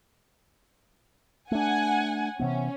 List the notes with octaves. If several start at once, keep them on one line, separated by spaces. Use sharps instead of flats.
A3 D4 F#5 G#5
C3 E3 B3 C#4